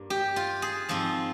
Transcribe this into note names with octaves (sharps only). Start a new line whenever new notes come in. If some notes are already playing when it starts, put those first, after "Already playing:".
Already playing: G2 A#3
G4
F4
G#4
G#2 F3 C4